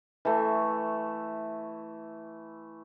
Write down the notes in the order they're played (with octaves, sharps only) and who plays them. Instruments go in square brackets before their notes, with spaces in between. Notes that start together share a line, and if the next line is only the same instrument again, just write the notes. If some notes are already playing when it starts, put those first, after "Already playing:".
[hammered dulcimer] E3 A3